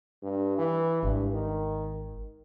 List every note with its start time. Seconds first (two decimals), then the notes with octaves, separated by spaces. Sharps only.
0.23 G2
0.58 E3
1.03 G#1 G2
1.33 D#3